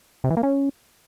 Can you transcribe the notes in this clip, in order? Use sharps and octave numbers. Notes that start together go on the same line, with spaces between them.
C3
E3
A#3
C#4